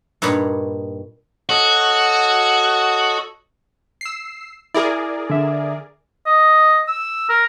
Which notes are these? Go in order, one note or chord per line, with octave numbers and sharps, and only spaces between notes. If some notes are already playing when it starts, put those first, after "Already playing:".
G2 A#2 D#4 C#5 B5
F#4 A4 C#5 D#5
E6 C7
E4 G#4 A#4 D5
D3 E5
D#5
E6
A#4